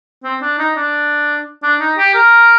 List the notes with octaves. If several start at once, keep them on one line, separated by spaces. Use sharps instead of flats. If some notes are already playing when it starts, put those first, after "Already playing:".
C4
D4
D#4
D4
D4
D#4
G4
A#4